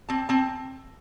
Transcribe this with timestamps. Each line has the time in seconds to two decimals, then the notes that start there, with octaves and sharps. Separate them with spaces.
0.09 C4 A5
0.29 C4 A5